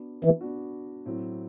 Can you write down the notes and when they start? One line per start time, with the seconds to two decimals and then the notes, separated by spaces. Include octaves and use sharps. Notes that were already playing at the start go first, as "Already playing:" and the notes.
Already playing: B3 D4 F#4
0.25 E3
0.41 B3 D4 F#4
1.06 A2 F#3 C4